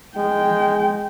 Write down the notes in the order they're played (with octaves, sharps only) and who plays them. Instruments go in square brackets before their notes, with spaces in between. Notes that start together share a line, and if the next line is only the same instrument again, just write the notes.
[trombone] G#3 [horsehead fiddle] G5